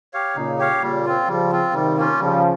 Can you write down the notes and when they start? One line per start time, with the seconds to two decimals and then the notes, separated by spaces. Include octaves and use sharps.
0.13 G4 C#5 F5
0.36 A#2 C#3 D#4
0.59 G4 C#5 F5
0.82 A#2 C#3 G3
1.05 C4 F4
1.28 C#3 F3 G3
1.52 C4 F4
1.74 C3 D#3 G3
1.97 A#3 C#4 F4
2.20 C#3 F3 G3